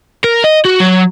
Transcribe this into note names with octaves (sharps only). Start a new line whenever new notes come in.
A#4
D#5
F#4
F#3